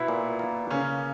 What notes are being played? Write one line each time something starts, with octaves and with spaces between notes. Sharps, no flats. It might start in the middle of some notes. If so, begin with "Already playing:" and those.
Already playing: B2 B3 E4
A#2
A#3
C#3 A#3 C#4